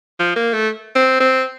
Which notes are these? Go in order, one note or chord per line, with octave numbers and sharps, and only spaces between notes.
F3
A#3
A3
C4
C4